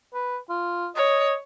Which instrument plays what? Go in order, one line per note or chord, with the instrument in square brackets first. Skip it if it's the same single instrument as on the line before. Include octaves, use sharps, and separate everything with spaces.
[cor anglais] B4
F4
[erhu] C#5 [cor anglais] D#5